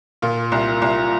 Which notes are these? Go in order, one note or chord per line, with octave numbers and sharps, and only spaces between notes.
A#2 F4
C2
C2